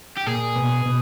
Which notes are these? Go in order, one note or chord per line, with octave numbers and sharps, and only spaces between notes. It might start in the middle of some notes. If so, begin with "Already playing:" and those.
G4
A#2 G#4
B2
B2